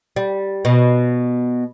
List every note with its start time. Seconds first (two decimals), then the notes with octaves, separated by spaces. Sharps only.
0.16 G3
0.65 B2